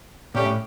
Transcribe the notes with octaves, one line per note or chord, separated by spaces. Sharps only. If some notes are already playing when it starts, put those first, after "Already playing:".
A#2 A3 C#4 G4
A2